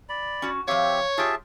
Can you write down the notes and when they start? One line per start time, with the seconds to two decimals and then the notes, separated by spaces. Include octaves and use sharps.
0.09 D5 B5
0.42 C#4 F#4
0.68 F3 C4 G4 C#5 E5 F5
1.18 F4 G4 G#4 E5 A5